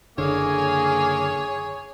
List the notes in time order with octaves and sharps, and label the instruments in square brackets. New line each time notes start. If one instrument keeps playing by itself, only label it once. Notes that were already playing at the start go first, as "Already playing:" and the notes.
[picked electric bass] F#1 D3 [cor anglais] A#3 [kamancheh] G#4 G#5 [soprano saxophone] C#5